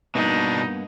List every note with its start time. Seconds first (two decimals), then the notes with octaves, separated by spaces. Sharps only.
0.15 G2 B2 A#3 B3 D4 D#4